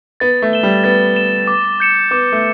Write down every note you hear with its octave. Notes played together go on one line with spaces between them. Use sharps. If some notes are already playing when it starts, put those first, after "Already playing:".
B3 A6
A3
E7 G7
G3
B3 A6
E7 G7
D6
G6 C#7 E7
B3 D6
A3